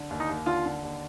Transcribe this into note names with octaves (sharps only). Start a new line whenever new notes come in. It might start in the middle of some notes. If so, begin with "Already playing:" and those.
Already playing: D3
D#2
D#4
D#2
D3 F4
D3
D#2